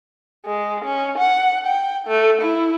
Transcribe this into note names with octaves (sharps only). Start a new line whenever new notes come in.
G#3
C#4
F#5
G5
A3
E4